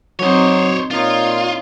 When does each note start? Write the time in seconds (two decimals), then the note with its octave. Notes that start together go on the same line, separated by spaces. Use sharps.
0.20 F#3 C4 D#4 C5 C#5
0.91 A#2 D#4 F4 C#5